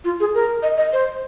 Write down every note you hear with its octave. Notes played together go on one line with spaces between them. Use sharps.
F4
G#4
A#4
D#5
D#5
C5